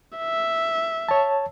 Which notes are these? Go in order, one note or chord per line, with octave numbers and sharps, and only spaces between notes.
E5
C#5 A5